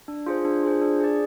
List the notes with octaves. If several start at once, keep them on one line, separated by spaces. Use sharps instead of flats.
D4
F4 G#4 C5
D4
F4 G#4 C5
D4
G#4 D5